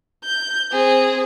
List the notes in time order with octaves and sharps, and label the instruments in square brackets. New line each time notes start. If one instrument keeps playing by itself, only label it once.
[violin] G6
C4 G#4